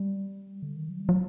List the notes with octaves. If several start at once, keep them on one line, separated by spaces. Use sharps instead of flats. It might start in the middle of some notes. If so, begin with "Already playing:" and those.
Already playing: G3
D3
D#3
F#3
G3
F#3